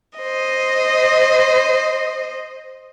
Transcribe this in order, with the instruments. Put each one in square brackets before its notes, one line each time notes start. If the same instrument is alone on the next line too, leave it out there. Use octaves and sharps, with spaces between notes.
[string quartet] C5 D#5